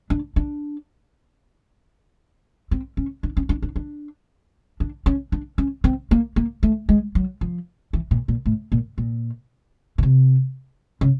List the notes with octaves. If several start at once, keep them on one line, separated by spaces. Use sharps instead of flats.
D4
D4
C4
C#4
D4
C#4
D4
D4
D4
D4
C#4
D4
C#4
C4
A#3
A#3
A3
G#3
F#3
F3
E3
A#2
A#2
A2
A#2
A#2
B2
C3
C#3